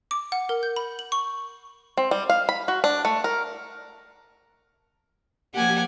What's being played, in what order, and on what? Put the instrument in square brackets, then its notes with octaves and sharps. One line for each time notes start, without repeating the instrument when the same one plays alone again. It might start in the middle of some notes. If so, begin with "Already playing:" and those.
[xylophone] D6
F#5
A#4
G6
B5
F#7
C#6
[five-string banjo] C4
G3
F5
B5
F#4
D4
A3
A#4
[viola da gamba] F3 A#3 G4 [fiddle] F#5 G#5